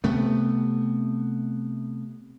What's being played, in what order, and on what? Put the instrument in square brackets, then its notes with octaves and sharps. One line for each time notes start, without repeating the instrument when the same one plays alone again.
[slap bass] C3 A3 B3